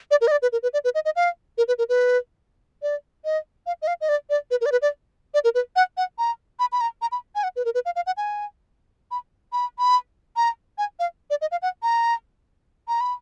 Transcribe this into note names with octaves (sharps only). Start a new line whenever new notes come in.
D5
A#4
D#5
D5
B4
A#4
B4
D5
B4
D#5
D#5
F5
A#4
B4
A#4
B4
D5
D#5
F5
D#5
F5
D#5
D5
D5
B4
A#4
D5
B4
D5
D5
A#4
B4
F#5
F#5
A#5
B5
B5
A#5
A#5
B5
G#5
F#5
B4
A#4
B4
F5
F5
F#5
G#5
B5
B5
B5
A#5
G#5
F5
D5
D#5
F5
F#5
A#5
A#5
B5